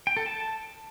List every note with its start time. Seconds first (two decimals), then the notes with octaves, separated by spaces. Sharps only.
0.07 G5
0.17 A4
0.26 A5